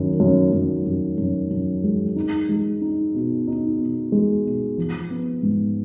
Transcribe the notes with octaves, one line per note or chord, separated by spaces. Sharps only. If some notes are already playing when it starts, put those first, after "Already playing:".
Already playing: F#2 D#3
F#2
F#2
F#2
F#2
F#2
G#3
D#4
G#3
D#4
B2
D#4
B2
G#3
B2
F3
B3
G#2